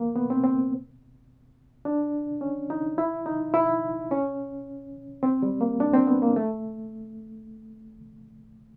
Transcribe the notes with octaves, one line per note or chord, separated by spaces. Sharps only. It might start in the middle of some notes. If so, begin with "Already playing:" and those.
Already playing: A#3
B3
C4
C4
D4
C#4
D#4
E4
D#4
E4
C#4
C4
G3
A#3
D4
C4
B3
A#3
A3